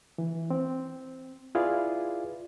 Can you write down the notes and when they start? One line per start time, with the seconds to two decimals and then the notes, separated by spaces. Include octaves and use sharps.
0.18 E3
0.50 C4
1.55 E4 F4 G#4 B4 D5 F5